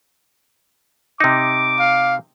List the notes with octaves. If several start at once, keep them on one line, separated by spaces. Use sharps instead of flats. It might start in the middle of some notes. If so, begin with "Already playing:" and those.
C3 D#4 D6
F5